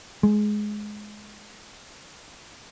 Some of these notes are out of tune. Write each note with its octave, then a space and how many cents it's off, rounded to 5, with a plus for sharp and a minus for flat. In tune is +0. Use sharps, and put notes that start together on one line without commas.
G#3 +15